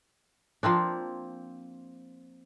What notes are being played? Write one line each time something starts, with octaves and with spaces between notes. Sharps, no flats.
F3 A#3 C4 D4